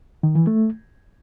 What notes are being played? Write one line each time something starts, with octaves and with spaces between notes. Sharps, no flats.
D#3
E3
A3